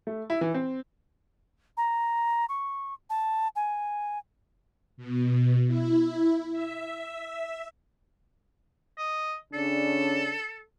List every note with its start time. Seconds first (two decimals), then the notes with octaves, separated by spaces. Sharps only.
0.07 A3
0.30 E4
0.41 E3
0.54 C4
1.77 A#5
2.49 C#6
3.10 A5
3.56 G#5
4.97 B2
5.67 E4
6.52 E5
8.98 D#5
9.53 C#3 C#4 D4 A4